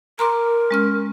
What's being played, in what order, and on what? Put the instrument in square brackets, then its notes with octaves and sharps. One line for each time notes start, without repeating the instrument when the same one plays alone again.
[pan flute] A#4 [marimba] A#5 C6 D6
[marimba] G#3 C#4 F6